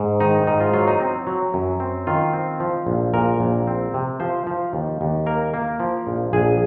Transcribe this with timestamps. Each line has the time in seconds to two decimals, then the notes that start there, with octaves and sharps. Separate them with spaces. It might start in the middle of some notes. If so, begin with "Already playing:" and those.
Already playing: G#2
0.20 D#3 D#4
0.47 G#2 D#4
0.60 F4
0.73 F#3 F4
0.87 D#4
1.00 C4
1.27 F#3
1.54 F#2
1.80 C4
2.07 D#3 F4
2.33 C4
2.60 F3
2.87 A#1
3.14 A#2 A#4
3.40 A#1
3.67 C4
3.94 C3
4.20 F3 C5
4.47 F3
4.73 D#2
5.01 D#2
5.26 A#3 A#4
5.54 A#3
5.80 F3
6.07 A#1
6.33 A#1 G#4